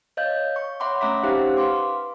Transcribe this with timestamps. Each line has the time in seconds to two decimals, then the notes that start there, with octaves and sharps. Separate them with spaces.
0.17 C#5 D#5 F5 G6
0.56 C#6
0.80 C#5 E5 F#5 B5 C6 D6
1.01 A3 C#4 E5 A#5 D6 B6
1.23 C#4 D#4 G4 C5 F5 F#5
1.57 B4 F5 C6 D6